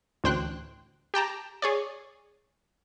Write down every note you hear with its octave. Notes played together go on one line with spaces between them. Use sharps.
A1 D2 C5 G5 F#6
G4 G5 A5 A#5
G#4 C#5 D5